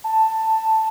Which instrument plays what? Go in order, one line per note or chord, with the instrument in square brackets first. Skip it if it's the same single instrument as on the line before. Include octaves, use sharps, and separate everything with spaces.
[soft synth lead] A5